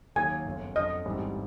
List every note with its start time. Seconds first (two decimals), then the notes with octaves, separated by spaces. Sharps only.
0.16 D#2 D#3 F#3 A#3 G#5
0.46 G1 F#2 C#3
0.75 F2 D3 F#3 D#5
1.05 A1 G#2 E3 G3 C4